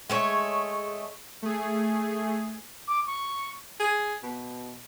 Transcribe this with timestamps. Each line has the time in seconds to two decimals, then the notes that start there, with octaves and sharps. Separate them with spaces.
0.09 G#3 A3 C#5
1.42 A3 G#4
2.88 D6
3.07 C#6
3.80 G#4
4.23 B2